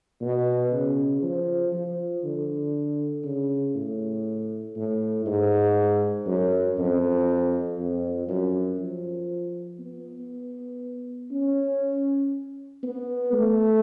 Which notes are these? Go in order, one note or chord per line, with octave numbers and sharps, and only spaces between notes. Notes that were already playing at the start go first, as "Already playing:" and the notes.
B2
C#3
F3
F3
D3
C#3
A2
A2
G#2
F#2
F2
F2
F#2
F3
B3
C#4
B3
A3